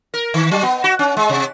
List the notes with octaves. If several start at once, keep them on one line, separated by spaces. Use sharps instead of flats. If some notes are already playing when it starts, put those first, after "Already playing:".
A#4
D#3
F#3
B3
F#4
C#4
G#3
C3